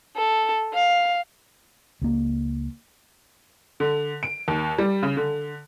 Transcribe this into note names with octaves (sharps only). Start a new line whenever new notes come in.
A4
F5
C#2 A#3
D3
D7
D#2
G3
C#3
D3